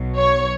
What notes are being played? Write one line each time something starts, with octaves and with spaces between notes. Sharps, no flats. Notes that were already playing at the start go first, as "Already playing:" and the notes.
Already playing: B1 B2 F#3
C#5